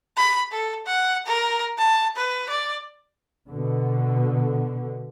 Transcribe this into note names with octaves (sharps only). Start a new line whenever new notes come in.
B5
A4
F#5
A#4
A5
B4
D5
B2 D3